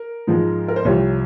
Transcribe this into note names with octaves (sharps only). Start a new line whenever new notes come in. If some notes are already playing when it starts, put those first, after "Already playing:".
Already playing: A#4
G#2 F3 G#3
A#4
C5
C2 C3 F3 C#5